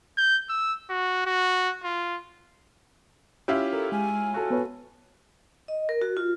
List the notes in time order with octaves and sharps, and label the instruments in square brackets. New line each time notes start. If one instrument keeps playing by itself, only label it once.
[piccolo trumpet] G6
E6
F#4
F#4
F4
[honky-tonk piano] C#4 E4 F4 [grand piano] G4 E5
[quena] A4 [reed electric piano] A#4
[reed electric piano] G#3 [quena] G#5
[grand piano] F#4 A4
[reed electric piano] B3 B4 C#5
[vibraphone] D#5
A#4
F#4
F4